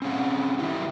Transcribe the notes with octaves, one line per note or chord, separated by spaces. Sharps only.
C4 C#4 G#4 F5 F#5
D#3 F#3 D#4 E4 G4